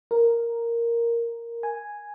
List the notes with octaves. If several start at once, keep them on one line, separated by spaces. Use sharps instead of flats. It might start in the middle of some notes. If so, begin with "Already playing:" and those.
A#4
G#5